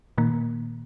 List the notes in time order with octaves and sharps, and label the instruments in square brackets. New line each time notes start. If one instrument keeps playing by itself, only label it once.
[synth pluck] A#2 D#3 A#3